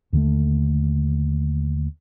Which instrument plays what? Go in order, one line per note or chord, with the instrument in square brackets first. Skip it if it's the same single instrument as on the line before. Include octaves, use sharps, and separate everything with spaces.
[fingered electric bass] D#2 D3 D#3 A3